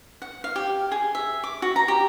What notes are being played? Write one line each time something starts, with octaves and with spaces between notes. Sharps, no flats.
F#5
F5
G4
G#4
E5
D6
F#4
A#5
G4